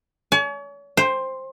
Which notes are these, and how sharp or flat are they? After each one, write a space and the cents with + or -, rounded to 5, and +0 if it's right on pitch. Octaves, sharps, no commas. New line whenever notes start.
C#5 +40 G#5 +40
C5 +5 G5 +25